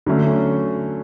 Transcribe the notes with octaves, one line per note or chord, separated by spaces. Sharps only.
D3 F#3 A3 C#4